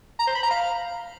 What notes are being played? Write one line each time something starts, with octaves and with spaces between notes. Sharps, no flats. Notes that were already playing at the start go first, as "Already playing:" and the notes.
A#5
C5
B5
A#5
F5